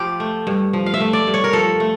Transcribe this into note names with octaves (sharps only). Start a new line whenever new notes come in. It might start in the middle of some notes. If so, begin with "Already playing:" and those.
Already playing: F3 F4 G4
A3
G2
F3
F5
E5
A3
D5
G2
C#5
A#4
F3 A4
A3